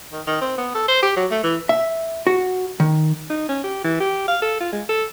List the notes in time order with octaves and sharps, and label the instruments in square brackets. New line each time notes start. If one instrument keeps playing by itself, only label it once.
[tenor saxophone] D#3
D#3
C4
B3
A4
C5
G4
F#3
A3
E3
[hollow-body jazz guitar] E5
F#4
D#3
[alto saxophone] D#4
C#4
G4
E3
G4
F5
A4
F4
G#3
A4